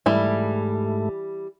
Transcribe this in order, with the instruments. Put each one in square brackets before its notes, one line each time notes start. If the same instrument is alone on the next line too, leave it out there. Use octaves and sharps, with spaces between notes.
[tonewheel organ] G#2 A3 [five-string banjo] E3 G3 E4